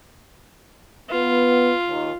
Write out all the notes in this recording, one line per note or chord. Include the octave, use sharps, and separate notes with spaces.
B3 F4
D#2